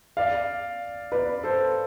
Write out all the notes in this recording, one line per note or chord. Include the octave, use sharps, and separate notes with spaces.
D5 F5
B4 D5
A4 C5